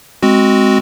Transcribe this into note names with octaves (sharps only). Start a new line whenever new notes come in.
G#3 C4 F#4